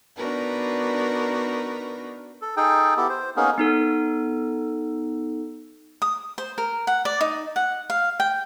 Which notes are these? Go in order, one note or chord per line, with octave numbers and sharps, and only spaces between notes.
B3 D4 D#4 F#4 A#4 B4
A4
D#4 G#4 A4 G5
B3 E4 G4 A4
C5
A#3 B3 C#4 D#4 G#4 A#4
B3 D#4 A4
D#6
C5
A#4
F#5
D5
D#4
F#5
F5
G5